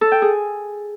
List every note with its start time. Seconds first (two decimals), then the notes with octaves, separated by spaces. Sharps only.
0.01 A4
0.12 G5
0.22 G#4